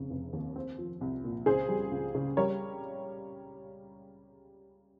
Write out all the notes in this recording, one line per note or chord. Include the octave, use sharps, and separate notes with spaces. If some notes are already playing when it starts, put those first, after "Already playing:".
Already playing: F1 C#3
F1
D#2
C4
F3
C2
A#2
C#2 G#4 C5
G3
C#2
C#3
G3 A#4 C#5